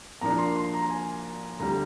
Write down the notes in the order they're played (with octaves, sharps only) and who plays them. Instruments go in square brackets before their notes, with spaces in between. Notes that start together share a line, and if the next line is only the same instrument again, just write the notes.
[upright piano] A#2 F3 A#3 D4 [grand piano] A#5
[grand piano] C6
C6
A#5
G#5
[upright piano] D2 D3 G3 [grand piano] A#5